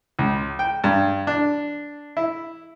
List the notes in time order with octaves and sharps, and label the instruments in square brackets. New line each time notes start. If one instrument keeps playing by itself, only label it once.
[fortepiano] C#2
G5
G2
D4
E4